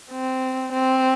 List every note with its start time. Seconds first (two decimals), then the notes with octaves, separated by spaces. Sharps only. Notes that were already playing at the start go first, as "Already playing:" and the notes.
0.11 C4
0.73 C4